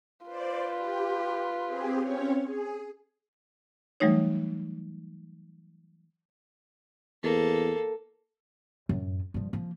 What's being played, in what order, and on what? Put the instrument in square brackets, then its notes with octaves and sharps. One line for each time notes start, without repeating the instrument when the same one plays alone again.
[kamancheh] F4 B4 [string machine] C5 D5
[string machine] G4
C4 G4 G#4
C4 C#4 C#5
G#4
[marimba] E3 F#3 G3 A3 D#4 C#5
[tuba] E2 [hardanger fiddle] A#3 A4
[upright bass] F#2 A2
G2 F3
F3 A#3